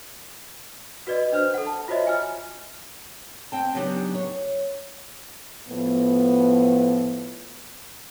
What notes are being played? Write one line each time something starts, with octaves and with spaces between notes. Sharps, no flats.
F#4 B4 D5 D#5
D4 C5 F6
A4 F#5
A5
F4 F#4 C5 C#5 D#5 E5
F4 G#5 F6
C4 G5 A5
C#3 F#3 B3 D4 D#4 G4
C#5
A2 F3 B3